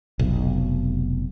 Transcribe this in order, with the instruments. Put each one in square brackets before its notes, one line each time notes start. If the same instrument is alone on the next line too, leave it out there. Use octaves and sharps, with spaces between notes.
[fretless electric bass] F1 B1